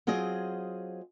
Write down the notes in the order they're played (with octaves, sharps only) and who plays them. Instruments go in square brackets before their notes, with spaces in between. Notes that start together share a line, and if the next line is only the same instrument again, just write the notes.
[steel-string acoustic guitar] F#3 C4 F4 G#4 D#5